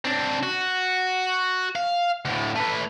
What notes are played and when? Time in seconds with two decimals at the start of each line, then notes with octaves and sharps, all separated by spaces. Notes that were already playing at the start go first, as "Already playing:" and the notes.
0.05 C4 D4
0.43 F#4
1.75 F5
2.25 D2 A2
2.55 A3 B4